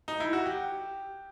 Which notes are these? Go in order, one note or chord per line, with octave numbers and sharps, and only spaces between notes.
D#4
E4
F#4
G4